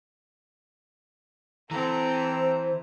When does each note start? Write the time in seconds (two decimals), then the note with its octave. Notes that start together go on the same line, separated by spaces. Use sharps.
1.71 E3 C4 A4 A#5
2.31 C5